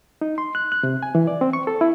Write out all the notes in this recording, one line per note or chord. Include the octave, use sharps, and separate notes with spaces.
D#4
C6
F#6
F#6
C3
G#5
E3
D5
C4
C#6
A4
E4